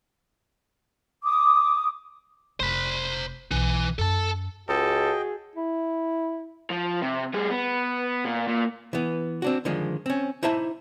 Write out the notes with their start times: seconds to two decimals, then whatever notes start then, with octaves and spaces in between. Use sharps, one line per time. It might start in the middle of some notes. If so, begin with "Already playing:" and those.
1.24 D6 D#6
2.60 F1 C5 B5
3.51 B1 E3 E4
3.99 F#2 A4 A5
4.69 C#2 F#4 G#4 A4 D#5 G5
5.56 E4
6.70 F3
7.02 C3
7.34 G3 G#4
7.50 B3
8.25 A#2
8.48 A#2
8.93 E3 B3
9.42 C4 D4 F#4
9.65 D3 D#3 F3 G#3
10.06 C4 C#4
10.43 D#4 E4 C5 E5 A5